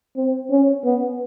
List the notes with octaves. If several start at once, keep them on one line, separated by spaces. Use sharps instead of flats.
C4
C#4
B3